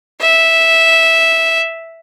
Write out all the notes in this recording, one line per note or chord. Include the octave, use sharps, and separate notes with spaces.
E5